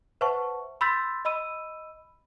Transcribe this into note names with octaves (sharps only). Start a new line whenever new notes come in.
B4 C5 E5 F#5 A5 C#6
B5 C6 E6 G6 A6 B6
D#5 B5 E6 D#7